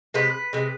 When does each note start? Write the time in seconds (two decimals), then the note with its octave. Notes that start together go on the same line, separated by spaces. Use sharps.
0.14 C3 G#3 B4
0.53 C3 G#3